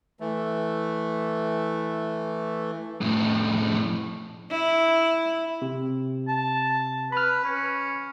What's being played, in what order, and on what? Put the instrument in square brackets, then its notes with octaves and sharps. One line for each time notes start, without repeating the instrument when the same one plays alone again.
[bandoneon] E3 A3
[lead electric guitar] F2 A2
[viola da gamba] E4
[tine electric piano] C3
[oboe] A5
[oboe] B4 [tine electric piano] B5 F6
[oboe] C#4